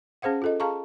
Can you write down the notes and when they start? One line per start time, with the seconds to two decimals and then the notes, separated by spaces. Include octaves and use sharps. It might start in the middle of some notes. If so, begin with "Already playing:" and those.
0.22 C#4 G#4 C5 F5 F#5
0.42 F4 A4 D#5
0.60 G#4 F5 A5 A#5 C#6